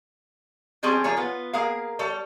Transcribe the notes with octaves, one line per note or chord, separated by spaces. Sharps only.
F3 G3 C4 C#4 G#4 A4
F3 A#3 G#4 C#5
B3 F4
A#3 G#4 A#4 F5
G3 A4 C#5